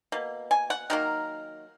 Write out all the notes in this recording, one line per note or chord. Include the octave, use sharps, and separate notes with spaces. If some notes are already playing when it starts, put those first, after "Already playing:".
B2 A#3
G#5
F#5
D#3 F#3 A#3 A#4